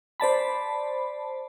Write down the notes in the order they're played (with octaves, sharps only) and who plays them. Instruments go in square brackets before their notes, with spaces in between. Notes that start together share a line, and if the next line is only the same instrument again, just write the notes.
[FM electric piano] C5 D5 A5 B5